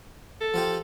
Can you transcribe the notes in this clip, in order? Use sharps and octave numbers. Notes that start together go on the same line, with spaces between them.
A4
F3 F4 G4